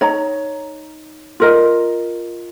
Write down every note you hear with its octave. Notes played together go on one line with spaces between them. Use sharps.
D#4 C#5 A#5
F4 A#4 D#5